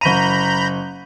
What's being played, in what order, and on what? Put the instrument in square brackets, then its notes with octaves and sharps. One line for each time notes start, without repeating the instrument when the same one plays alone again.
[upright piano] F#1 D#7 [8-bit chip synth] A#5 B5 G6